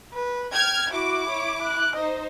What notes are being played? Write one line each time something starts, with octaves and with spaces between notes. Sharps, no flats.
B4
G5 F6 G#6
E4 F#4 D6
C#5
F#6
D#4 C5 D#5